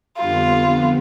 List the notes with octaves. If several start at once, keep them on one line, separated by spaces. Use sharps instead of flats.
F2 D3 G3 B3 F4